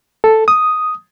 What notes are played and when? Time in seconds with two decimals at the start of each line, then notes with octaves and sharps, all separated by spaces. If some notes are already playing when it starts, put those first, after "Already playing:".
0.24 A4
0.48 D#6